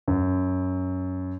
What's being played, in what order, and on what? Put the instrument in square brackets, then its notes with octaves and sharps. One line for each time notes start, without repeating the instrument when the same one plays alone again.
[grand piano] F#2